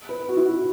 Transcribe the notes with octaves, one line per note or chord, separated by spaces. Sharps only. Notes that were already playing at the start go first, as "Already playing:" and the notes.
B4
F#4
E4
F#4